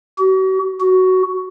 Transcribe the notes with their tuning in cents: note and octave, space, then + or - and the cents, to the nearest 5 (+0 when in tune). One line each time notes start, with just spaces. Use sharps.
F#4 +40
F#4 +10